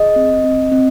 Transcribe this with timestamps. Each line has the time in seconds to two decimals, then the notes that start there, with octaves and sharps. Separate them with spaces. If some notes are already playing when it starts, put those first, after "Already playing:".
Already playing: G#4 D#5
0.16 C4
0.44 C4
0.72 C4